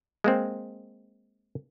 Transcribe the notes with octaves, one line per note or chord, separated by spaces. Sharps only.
G#3 A#3 C4